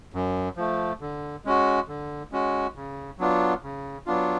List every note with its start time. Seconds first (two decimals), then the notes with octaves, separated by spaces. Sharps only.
0.14 F#2
0.57 F3 A3
1.01 D3
1.45 G#3 C#4 F#4
1.88 D3
2.32 G#3 C#4 F#4
2.76 C#3
3.19 F#3 B3 D4 F4
3.63 C#3
4.06 F#3 B3 D4 F4